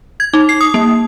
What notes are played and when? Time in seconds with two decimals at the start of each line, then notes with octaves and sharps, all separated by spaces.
0.20 G#6
0.33 D#4
0.49 C7
0.61 D#6
0.74 A#3